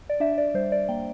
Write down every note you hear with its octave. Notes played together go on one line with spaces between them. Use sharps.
D5
D4 E5
D5
G3 C5
D5
A#3 G5